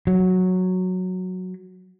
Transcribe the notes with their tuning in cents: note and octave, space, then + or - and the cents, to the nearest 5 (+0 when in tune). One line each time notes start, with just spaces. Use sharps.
F#3 -5